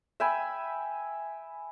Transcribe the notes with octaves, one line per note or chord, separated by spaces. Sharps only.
E5 G5 G#5 B5